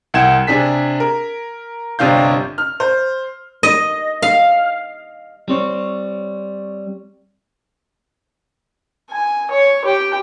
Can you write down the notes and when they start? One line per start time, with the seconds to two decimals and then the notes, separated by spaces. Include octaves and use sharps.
0.14 C2 F#5 G5 G#6 E7
0.47 C3 D4 G#4 B6
1.00 A#4
1.99 G1 C3 D4 F5 G6
2.58 F6
2.80 C5
3.63 D#5
4.22 F5
5.48 G3 C4 C#5
9.11 G#5
9.51 C#5
9.84 G4 G5